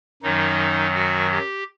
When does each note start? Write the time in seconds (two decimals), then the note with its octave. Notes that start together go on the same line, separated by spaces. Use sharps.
0.22 F#2 D#3 F#3 D#4
0.94 F#4
1.31 G4